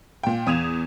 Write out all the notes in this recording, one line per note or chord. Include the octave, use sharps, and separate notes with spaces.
A#2 G5
E2 D#6 G#6 E7 F7